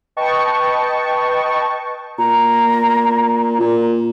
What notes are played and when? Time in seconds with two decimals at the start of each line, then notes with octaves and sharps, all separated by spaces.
0.17 B4 D#5 G5 A5 C#6
2.19 A#2 A#5
3.60 A#2